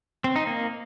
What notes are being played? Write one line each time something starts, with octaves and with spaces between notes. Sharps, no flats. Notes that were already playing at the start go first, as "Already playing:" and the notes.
C4
D#4
A#3